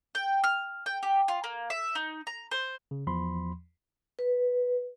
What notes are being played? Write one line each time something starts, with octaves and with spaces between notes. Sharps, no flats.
G5
F6
G5
G4
F4
A#3
E5
D#4
A#5
C5
C#3
E2 F3 B5 C6
B4